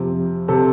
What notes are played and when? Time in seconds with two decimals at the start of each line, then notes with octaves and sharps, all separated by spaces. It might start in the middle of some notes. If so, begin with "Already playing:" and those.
Already playing: F2 C3
0.48 C3 A4